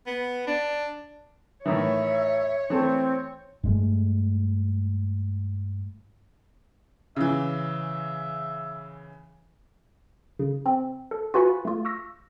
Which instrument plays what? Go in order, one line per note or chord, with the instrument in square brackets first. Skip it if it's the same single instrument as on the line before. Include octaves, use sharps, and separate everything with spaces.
[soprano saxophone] B3
D4
[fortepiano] A2 D#3 E3 [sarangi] C#5 [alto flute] E5
[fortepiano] E3 A3 A4 [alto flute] C4
[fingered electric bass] G2 G#3 A3
[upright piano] C#3 E3 [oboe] E5
[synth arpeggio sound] C#3
C4
A4
F4 F#4 B4 G#5 B5 C#6
A3 F4
C#6 E6 A#6